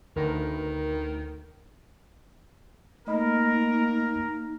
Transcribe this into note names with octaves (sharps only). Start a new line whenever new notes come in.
D2 D#3 A#4 B4
A3 A#3 D#4 A#4 D#5 B5